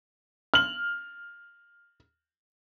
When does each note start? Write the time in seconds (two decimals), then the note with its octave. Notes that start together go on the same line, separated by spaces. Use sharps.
0.54 F6 F#7